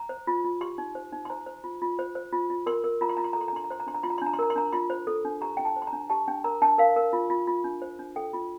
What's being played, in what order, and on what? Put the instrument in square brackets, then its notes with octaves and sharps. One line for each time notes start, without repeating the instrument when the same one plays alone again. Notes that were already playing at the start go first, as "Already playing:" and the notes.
Already playing: [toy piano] A#5
C5
F4
F4
G4 C6
D#4
C5
D#4
C6
C5 A#5
C5
F4
F4
C5
C5
F4
F4
A#4 C6
A#4
F4 A#5
C6
F4 A#5
C6
A4 A#5
C6
A#5
D4 C6
A#5
C5 C6
A#5
D4 C6
A#5
F4 C6
A#5
C6
D4 A#5
C6
A#4 A#5
C6
D4 A#5
F4 C6
C5
A4
D4
G4 A#5
D4 G5
A5
C5
C6
A#5
D4
G4 A5
D4 G5
A#4 A#5
D4 A5
A#4 F5
A#4
F4
F4
F4
D4
C5
D4
A4 G5
F4